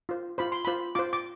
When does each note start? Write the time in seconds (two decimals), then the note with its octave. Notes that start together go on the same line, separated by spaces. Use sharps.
0.09 F4 C5
0.38 F4 C5 B5
0.52 C6
0.65 F4 C5 B5
0.95 F4 C5 D6
1.13 D6